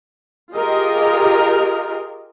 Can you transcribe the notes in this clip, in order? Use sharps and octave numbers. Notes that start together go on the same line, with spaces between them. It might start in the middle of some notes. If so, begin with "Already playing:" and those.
F4 G4 G#4 A#4 D#5